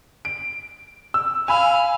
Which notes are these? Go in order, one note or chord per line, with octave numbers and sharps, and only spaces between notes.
D7
E6
F5 G#5 B5 E6